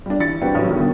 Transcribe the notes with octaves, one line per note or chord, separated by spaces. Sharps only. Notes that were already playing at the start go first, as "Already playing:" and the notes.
G3 D4
E3 D5 A6 C#7
G3 C4 D4 F#4 G4 B4
A1 F#3
E2 D3 D#3
G2 B2 D#3